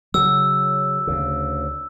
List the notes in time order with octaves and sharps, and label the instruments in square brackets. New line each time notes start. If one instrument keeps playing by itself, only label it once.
[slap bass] C#3 F#3 [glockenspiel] E6
[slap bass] D2 C#3